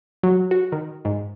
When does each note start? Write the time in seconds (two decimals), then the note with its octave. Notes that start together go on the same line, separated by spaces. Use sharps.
0.23 F#3
0.51 F#4
0.72 D#3
1.05 G#2